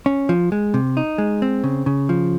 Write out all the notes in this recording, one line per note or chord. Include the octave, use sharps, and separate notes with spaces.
C#4
F3
G#3
C3
D#4
G#3
C4
C#3
C#3
F3